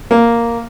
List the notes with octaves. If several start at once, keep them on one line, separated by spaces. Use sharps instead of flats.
A#3